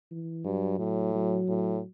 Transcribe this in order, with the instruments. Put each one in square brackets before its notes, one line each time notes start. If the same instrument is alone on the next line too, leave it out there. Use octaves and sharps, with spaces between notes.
[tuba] E3
[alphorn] G2 [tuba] F#3
[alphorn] A2
[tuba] F#3
[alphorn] A2